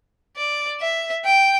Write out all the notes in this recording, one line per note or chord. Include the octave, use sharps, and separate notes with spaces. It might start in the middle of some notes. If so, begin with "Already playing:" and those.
D5
E5
G5